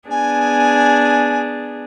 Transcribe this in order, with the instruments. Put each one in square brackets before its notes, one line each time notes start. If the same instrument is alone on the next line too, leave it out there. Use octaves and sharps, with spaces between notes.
[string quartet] B3 D4 G#4 [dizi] G#5